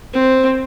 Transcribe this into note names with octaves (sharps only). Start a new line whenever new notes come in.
C4